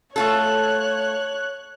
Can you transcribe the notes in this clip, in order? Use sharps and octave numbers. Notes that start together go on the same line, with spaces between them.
A3 F4 A4 C#5 F#6